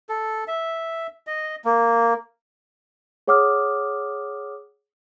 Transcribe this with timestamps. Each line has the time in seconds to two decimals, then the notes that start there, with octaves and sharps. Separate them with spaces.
0.09 A4
0.48 E5
1.27 D#5
1.65 A#3
3.28 G#4 C#5 F#5 D6 D#6 F6